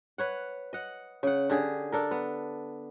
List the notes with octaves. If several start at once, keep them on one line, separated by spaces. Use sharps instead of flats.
B4 C#5 F#5
D#5 F#5
C#3 F#5
D3 G4 G#4
D4 A4 A#4
B3